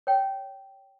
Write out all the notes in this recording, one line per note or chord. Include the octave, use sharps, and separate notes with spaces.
C#5 G5